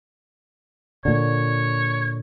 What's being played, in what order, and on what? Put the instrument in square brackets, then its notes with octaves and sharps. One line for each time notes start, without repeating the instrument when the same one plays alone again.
[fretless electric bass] A#2 D3 [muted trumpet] C#5